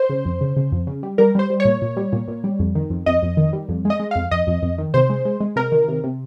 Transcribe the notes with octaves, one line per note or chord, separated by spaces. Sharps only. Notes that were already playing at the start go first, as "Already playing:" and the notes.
Already playing: C5
C#3
F2
C#3
C#3
F2
C#3
G3
G3 A#4
G3 C5
G3
C#5
A#2
A#2
G3
A#2
A#2
G3
F2
D#3
F2
F2 D#5
F2
D#3
G3
F2
G#3
D#5
G#3
F2 F5
F2 D#5
F2
F2
D#3
C3 C5
G#3
G#3
G#3
C3 A#4
D#3
C3
C3